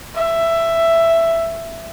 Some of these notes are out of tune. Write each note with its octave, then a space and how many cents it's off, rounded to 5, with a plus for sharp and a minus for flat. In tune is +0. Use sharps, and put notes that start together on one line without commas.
E5 +10